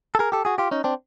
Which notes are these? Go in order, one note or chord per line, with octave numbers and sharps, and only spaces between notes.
A4
G#4 A#4
G4 A4
F#4 G#4
F4 G4
C#4 D#4
C4 D4